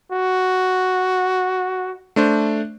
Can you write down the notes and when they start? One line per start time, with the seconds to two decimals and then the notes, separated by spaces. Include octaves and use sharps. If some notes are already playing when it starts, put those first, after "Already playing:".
0.12 F#4
2.16 A3 D4 C5